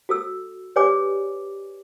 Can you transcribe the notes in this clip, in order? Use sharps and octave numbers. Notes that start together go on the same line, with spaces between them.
F#4 A4 E6
G4 B4 C#5 D5 G#5 D6